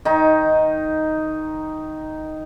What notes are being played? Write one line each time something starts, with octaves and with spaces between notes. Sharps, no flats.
D#3 D#4